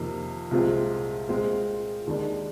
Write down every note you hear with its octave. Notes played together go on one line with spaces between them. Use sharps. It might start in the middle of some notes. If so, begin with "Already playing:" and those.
Already playing: F2 C3 D#3 A#3
C2 A#2 G#3 C4 F4
A#2 G#3 C4 F4
D#2 D#3 G#3 D4